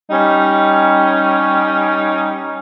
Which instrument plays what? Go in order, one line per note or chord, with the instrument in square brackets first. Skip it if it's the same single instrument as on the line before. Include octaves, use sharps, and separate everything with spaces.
[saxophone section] G3 C#4 D#4